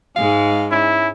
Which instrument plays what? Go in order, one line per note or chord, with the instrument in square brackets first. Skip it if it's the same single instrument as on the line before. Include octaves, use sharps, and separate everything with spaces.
[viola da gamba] G#2 G#3 [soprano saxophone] F5
[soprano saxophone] C#4 [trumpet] E4